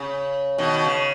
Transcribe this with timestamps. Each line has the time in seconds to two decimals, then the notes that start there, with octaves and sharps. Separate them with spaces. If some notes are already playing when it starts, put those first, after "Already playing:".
Already playing: C#3
0.58 B2 D#3
0.84 C#3